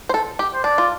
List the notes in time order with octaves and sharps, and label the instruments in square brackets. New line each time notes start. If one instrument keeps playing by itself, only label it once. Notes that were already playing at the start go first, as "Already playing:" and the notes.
[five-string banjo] C5
A4
G4
[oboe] C5
[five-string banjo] D4 [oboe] D5
[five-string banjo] F4